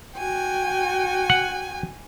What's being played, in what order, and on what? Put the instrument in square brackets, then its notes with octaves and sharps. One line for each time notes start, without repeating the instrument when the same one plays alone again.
[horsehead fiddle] F#4 G5 [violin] G#5
[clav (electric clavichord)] F#5